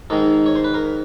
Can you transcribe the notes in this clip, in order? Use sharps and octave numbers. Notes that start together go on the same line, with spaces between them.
G#2 D#3 G#3 A4
C#5
C5
B4
A#4